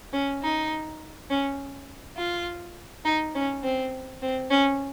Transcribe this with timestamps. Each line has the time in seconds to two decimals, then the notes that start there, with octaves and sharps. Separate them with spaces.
0.13 C#4
0.43 D#4
1.30 C#4
2.17 F4
3.05 D#4
3.35 C#4
3.64 C4
4.22 C4
4.51 C#4